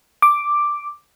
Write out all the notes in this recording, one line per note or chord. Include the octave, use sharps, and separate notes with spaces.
D6